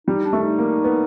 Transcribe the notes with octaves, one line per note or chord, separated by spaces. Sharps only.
G3 D#4
D4
A3
D#4
A#3
B3